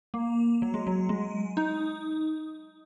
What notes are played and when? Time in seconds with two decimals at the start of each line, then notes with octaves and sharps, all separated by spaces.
0.14 A#3
0.62 F#3
0.74 G#3
0.87 F#3
1.09 G#3
1.57 D#4